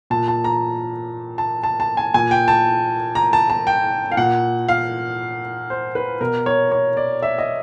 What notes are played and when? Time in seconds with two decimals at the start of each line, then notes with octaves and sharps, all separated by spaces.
0.10 A#2 A5
0.28 A5
0.44 A#5
1.38 A5
1.63 A5
1.80 A5
1.97 G#5
2.14 A#2 G#5
2.31 G5
2.48 A5
3.15 A#5
3.33 A5
3.50 A5
3.67 G5
4.12 F5
4.17 A#2 F#5
4.69 F5
5.70 C5
5.95 B4
6.21 B2 A#4
6.46 C#5
6.72 C#5
6.97 D5
7.22 E5
7.38 D#5